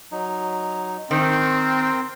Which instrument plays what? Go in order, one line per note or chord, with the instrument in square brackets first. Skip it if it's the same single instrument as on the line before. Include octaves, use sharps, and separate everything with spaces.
[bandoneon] F#3 D#4
[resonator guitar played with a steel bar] D#3 [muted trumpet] C4 [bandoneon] A#4 C5 G5